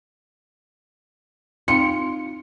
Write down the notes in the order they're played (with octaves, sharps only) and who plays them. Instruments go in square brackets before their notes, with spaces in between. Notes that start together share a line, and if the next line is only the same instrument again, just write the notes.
[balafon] C4 D#4 [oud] F4 [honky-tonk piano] C#7